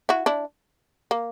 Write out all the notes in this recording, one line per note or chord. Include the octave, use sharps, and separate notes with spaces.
E4 F#4
D4 E4
A#3